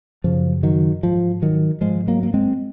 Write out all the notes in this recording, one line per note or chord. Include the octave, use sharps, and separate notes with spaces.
F#2 C#3 F3
D#3 F#3
G#2 F3
D#3 F#3
G#2 F3 G#3
F#3 A#3
A#3
G#3 C4